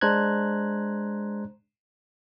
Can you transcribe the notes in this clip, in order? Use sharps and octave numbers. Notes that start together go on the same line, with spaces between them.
G#3 D4 C5 A#5 F#6 G#6